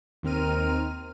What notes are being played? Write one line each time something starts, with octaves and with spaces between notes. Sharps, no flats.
D#2 D#3 C4 A#4 F6 D#7